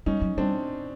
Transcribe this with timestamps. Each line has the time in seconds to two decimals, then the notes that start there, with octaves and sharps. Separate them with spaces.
0.06 G3 C#4 D#4
0.22 F#3
0.37 G3 C4 D4